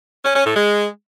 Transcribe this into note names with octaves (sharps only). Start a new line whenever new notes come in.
C#4
C#4
A2
G#3